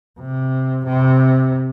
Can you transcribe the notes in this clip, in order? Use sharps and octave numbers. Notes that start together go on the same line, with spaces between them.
C3
C3